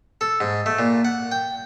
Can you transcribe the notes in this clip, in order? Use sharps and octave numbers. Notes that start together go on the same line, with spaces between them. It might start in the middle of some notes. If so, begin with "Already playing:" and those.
A4
G#2
A3
A#2
F#5
G5